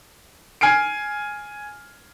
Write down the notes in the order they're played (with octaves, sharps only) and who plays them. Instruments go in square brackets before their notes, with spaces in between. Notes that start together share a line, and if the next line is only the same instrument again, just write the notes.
[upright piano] G#5 F6 C7 D7